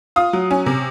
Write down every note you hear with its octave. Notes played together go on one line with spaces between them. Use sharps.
F4 D#6
F#3
C#4
C3